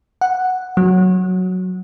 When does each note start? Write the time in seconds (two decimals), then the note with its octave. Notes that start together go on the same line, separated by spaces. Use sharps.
0.21 F#5
0.77 F#3